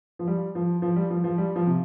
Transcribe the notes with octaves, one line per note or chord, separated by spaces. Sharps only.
F3
G3
F3
F3
G3
F3
F3
G3
F3
C3